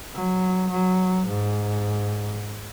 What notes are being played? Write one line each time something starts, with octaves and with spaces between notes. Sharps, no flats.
F#3
F#3
G#2